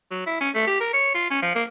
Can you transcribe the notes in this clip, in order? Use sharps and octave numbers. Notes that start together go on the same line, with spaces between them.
F#3
E4
C#4
A3
G4
A#4
C#5
F4
C#4
F3
A#3